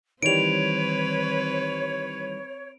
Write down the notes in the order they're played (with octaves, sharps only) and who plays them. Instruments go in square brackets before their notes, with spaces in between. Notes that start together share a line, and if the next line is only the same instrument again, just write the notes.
[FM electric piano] D#3 E3 G3 [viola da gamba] C4 B4 [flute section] C#5 [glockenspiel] D7 F7